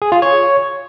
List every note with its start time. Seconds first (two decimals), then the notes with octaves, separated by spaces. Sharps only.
0.02 G#4
0.12 F4
0.22 C#5